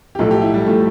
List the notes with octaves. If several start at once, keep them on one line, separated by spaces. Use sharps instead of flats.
G4
B1 A2 F3 A4
G4
E4
G3
A2 F3 A3